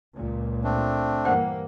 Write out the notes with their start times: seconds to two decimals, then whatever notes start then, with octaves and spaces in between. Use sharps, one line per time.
0.16 C#2 A#2
0.64 A3 C4 D4
1.25 G2 E3 A#3 C5 F#5 G5